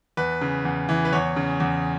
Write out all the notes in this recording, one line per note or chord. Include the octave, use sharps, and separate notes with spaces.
E2 B4
C#3
E2
E3
B4
E2 C#5
C#3
E2